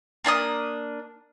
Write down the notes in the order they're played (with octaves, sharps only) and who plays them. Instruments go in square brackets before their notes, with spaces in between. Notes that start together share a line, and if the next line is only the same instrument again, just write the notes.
[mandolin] A#3 D4 G#5 D#6